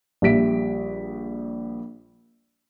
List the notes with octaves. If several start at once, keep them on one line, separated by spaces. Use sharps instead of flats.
A#1 G3 E5 B6 D7